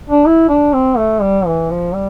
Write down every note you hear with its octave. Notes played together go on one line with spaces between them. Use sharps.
D4
E4
D4
C4
A3
G3
E3
F3
G3